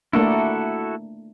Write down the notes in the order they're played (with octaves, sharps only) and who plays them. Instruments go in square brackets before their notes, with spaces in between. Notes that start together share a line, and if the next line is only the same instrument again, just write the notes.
[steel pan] A3 A#3 D4 [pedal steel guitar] E4 F#4 A4